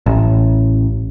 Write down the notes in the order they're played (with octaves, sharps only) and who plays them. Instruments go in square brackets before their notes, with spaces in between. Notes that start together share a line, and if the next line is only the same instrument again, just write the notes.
[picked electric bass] A1